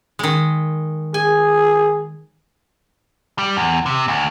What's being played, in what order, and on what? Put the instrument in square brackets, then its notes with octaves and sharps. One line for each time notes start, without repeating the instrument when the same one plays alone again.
[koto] D#3 G#3
[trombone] G#4 [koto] G#5
[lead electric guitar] G3
E2
C3
D2